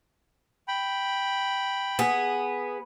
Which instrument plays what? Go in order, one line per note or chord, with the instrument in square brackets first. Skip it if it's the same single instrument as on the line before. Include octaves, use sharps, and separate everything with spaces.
[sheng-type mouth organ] G5 B5
[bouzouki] B3 G#4